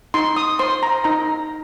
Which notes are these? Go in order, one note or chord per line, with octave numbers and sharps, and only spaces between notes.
D#4 C6
D#6
C5 C6
A#5
D#4 A#5